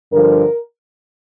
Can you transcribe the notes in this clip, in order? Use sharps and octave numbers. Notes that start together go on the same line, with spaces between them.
G2 D3 F3 A#4